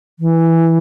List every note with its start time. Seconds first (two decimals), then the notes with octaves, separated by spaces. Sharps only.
0.19 E3